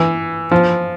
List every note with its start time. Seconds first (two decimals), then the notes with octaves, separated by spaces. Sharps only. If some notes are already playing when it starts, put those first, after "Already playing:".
Already playing: E3
0.51 F3